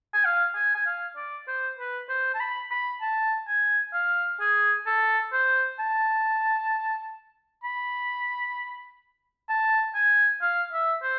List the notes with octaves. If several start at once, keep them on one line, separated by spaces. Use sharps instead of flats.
G#5
F5
G#5
G#5
F5
D5
C5
B4
C5
A5
B5
B5
A5
G#5
F5
G#4
A4
C5
A5
B5
A5
G#5
F5
E5
C5